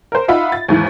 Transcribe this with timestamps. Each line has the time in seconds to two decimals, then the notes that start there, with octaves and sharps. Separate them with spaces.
0.12 A#4 C5
0.28 D#4 F4 E5 F#5 B5
0.52 A6
0.68 D#2 G#2 E3